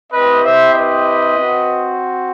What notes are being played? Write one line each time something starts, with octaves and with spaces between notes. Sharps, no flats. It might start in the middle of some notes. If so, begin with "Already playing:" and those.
C4 E4 G4 B4 D#5
C5 E5
B4 D#5
C4 F#4